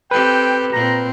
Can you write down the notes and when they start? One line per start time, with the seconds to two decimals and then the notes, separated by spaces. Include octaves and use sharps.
0.11 C4 G4 A4 B4 G5
0.73 A#2 C4 A#5